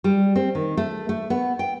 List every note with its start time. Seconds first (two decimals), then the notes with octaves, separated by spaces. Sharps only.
0.04 G3
0.36 C4
0.55 D#3
0.77 A3
1.09 A3
1.30 B3
1.59 G5